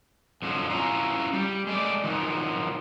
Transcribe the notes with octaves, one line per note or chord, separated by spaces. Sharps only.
F2 D3 F3 F#3
C#4 E4 F4 A#5
G3
G#3 A3 D5
D#3 F3 F#3